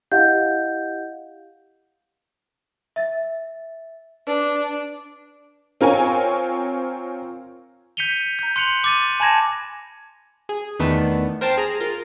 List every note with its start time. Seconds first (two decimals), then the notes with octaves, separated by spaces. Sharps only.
0.12 E4 G4 D#5 F5 F#5 G6
2.96 E5 A6
4.27 D4 B4
5.81 C4 F4 A#4 C#5 G#5
7.97 G6 B6 C#7 D#7 F7 G7
8.39 A#5 G6
8.56 C6 F#6 C#7 F7 F#7
8.84 D6 A6 D#7
9.20 G#5 A5 B5 G#6 A#6 E7
10.49 G#4
10.79 E2 D#3 A3 B3 D4
11.41 A#4 C5 G5 A5
11.58 G#4 A#5
11.80 F4 A#4